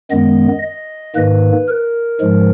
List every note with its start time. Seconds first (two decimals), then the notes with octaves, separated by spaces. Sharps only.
0.11 F#2 D#3 G#3 B3 D#5
0.63 D#5
1.15 G#2 D#3 A#3 B4
1.68 A#4
2.20 G#2 F3 G#3